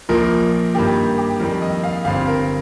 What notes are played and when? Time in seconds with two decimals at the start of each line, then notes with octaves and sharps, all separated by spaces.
0.09 A#1 A#2 F3 A#3 A#4
0.74 G2 D#3 A#3 G4
1.18 G4
1.40 F2 D#3 G3 A#3 A#4
1.62 D#5
1.83 F5
2.05 G1 G2 G3 C4 F5
2.27 A#4